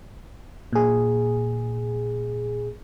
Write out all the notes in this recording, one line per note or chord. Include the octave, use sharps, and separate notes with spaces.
A#2 G#4